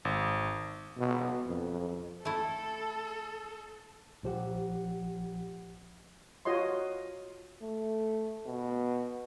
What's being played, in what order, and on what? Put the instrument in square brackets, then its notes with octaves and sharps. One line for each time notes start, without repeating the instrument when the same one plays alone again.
[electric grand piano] G#1
[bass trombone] B2
F2
[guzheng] A3 E4 [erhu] A4
[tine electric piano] A#1 F3 G4 F#5
[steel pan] F4 F#4 C#5 D#5 C6
[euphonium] A3
B2